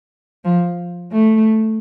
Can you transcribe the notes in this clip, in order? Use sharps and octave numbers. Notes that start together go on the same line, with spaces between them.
F3
A3